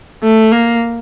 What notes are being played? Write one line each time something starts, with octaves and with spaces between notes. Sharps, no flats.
A3
A#3